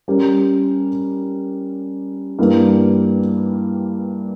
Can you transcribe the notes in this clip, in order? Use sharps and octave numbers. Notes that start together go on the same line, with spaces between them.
G3 C#4 G4 A#4
G2 E3 G3 A#3